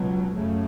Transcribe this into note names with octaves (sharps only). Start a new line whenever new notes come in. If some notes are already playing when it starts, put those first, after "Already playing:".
Already playing: C#2 B2 F#3
F#2 C#3 A3